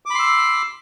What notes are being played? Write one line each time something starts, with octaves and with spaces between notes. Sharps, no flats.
B5 C6 D6 E6